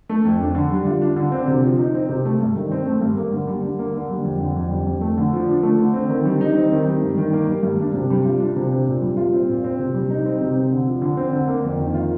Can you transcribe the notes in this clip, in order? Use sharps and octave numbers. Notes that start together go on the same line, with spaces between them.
A3
F2
D4
D3
G3
F4
D4
D3
C4
C3
F3
D#4
C4
C3
A3
G2
D#3
C4
A3
G2
A#3
D3
G3
D3
A#3
D3
G3
F2
D3
F2
G3
F2
A3
D3
F3
D4
A3
D3
C4
D#3
G3
D#4
C4
D#3
G3
G2
D#3
A#3
G3
G2
D4
C3
G3
F4
D4
C3
C4
A#2
G3
F4
C4
A#2
C4
C3
G3
D#4
C4
C3
C4
D3
F3
D3
C4
D3
A#3
F2
D#3
F4